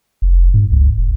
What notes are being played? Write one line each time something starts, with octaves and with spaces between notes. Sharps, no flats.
F1
G#2
C#2
E1